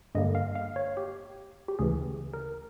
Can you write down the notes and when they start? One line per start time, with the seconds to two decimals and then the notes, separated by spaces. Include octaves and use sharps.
0.15 G2 D3 G3 A#3 D#5
0.35 F5
0.55 F5
0.76 C#5
0.97 G4
1.68 G4
1.79 D2 C#3 E3 G#4
2.34 A#4